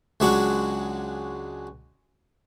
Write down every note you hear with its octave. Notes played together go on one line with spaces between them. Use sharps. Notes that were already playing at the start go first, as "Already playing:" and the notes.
C#2 F#3 G#3 D4 F#4 C#6